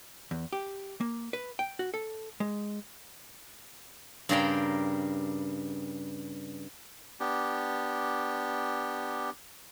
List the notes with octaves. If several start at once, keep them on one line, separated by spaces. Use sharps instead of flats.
E2
G4
A#3
B4
G5
F#4
A4
G#3
G2 C#3 G4 A#4 G5
B3 D4 G4